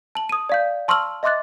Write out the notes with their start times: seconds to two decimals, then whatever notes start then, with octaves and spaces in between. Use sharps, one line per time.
0.15 A5 F#7
0.29 D#6 D#7
0.49 D5 F5 G6
0.88 A5 C6 C#6 E6 F6 F#7
1.23 D#5 E5 C6 D6 F#6 A6